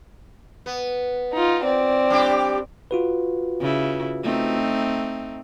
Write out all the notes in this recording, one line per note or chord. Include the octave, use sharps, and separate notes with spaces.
B3
D#4 F4
C4 D5
G3 D4 G4
F4 F#4 B4
C#3 E4
A3 C4 D#4